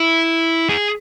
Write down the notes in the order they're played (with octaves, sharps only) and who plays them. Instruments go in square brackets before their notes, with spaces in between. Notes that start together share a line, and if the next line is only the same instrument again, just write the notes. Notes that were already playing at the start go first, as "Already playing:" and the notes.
Already playing: [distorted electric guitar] E4
G#4